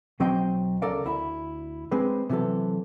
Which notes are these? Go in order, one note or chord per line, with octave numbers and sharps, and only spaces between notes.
B1 F#3 C4 D#5 G5 C6
C#2 C#3 A4 A#4 D5 F5
D2 E4 E5 B5
G#3 C4 D4 G#4 B4
C3 E3 F#3 B3 A4